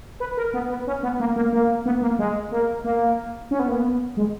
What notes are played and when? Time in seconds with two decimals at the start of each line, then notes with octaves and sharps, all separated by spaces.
0.20 B4
0.37 A#4
0.54 B3
0.70 B3
0.87 C#4
1.03 B3
1.20 A#3
1.36 A#3
1.52 A#3
1.86 B3
2.02 A#3
2.19 G#3
2.52 A#3
2.84 A#3
3.51 C#4
3.60 B3
3.68 A#3
3.77 B3
4.17 G#3